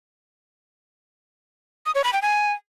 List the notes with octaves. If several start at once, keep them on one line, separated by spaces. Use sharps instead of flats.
D#6
C#5
B5
G5
G#5